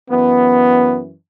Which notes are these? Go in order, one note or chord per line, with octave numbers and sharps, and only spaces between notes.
F#2 E3 B3